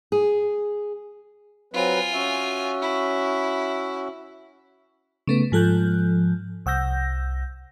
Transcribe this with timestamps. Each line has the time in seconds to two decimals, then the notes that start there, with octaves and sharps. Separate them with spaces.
0.12 G#4
1.73 F#3 C4 F4 B4 G#5
2.13 C#4 F#4 E5
2.81 E4
5.27 C#3 A3 B3
5.52 G#2 F3 A4 F#6 G6
6.66 C2 F#5 E6 G6 A#6